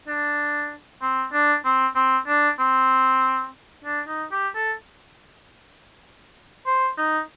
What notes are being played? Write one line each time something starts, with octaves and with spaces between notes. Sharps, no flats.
D4
C4
D4
C4
C4
D4
C4
D4
D#4
G4
A4
C5
D#4